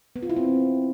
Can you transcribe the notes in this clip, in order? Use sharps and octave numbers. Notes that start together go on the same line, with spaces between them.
B3
F4
E4
C4